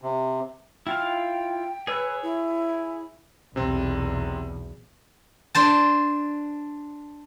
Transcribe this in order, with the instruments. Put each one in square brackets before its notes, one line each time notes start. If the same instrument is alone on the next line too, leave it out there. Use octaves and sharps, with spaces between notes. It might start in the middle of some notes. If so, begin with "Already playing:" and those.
[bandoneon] C3
[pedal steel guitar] E4 F4 F5 [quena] G5
[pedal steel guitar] G#4 C#5 E6 [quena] B4
[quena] E4
[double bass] B1 E2 [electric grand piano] C3 C4
[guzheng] D4 C5 A5